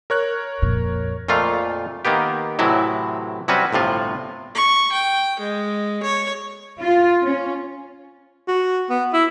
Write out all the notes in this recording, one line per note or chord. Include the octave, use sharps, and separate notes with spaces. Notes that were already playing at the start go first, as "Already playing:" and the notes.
A#4 C#5 F#6
F2 A#2
F2 A#2 A3 F4 F5
D#3 A#3 B3 G4
A2 C3 E3 F#3 E4
C3 F#3 G3 C#4 F#4 B4
G1 A2 C3 F4
C#6
G5
G#3
C#5
F4
C#4
F#4
B3
E4